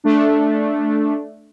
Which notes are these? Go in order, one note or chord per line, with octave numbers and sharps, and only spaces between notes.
A3 D4